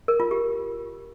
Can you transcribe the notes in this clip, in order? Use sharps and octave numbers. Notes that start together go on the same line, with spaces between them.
A#4
F4
G4